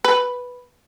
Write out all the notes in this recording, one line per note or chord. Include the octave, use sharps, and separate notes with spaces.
B4